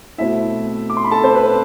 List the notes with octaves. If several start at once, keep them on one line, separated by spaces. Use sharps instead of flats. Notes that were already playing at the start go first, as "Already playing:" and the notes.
B2 A3 C4 E4 E5
D6
C6
B5
A4 A5
C4 C5
B4
B4